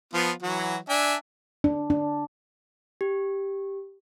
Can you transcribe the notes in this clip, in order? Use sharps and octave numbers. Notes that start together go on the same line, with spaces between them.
F3 B3 F4
E3 F#3 F#4
D4 E5 G#5
D4
D4
G4